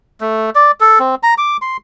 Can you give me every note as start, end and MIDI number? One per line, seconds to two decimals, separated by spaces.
0.21 0.50 57
0.55 0.71 74
0.80 0.99 69
1.00 1.15 60
1.23 1.34 82
1.38 1.57 86
1.62 1.77 84